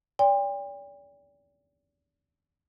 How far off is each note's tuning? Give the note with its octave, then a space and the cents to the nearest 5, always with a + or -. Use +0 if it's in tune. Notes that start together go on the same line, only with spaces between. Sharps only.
D5 -35 G5 +35 C6 +0